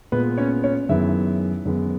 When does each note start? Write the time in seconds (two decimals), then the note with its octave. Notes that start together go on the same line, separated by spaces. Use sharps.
0.12 A#2 G#3 B3 B4
0.38 C#4 C#5
0.64 C#4 C#5
0.89 F#2 D#3 G#3 B3 E4 E5
1.65 F#2 D#3 G#3 B3